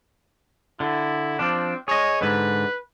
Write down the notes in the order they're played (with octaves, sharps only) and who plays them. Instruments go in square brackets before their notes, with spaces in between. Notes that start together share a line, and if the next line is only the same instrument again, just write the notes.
[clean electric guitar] D3 [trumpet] E4
[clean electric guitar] F3 D4 [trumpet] C4
[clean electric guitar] G#4 D#5 [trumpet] C#5
[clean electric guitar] G#2 D3 [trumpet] B4